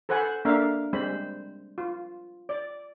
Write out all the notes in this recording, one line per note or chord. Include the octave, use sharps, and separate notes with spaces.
A4 B4 C5 F#5 G#5
A#3 D4 A4 A#4 E5 F5
G3 G#3 C4 C5 B5
F4
D5